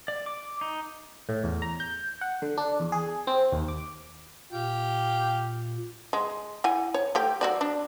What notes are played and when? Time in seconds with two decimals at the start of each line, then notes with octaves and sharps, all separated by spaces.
0.08 D5
0.26 D6
0.61 D#4
1.29 A2
1.44 E2
1.62 A#5
1.80 G6
2.21 F#5
2.42 D3
2.57 D4
2.80 E2
2.92 G#4
3.27 C4
3.52 D#2
3.68 D6
4.52 A#2 G4 F5 G5
6.13 G#3
6.64 E4 F#5 G#5
6.94 C#5
7.15 A3 G4 G5
7.41 F#3 F#4 D5
7.61 D4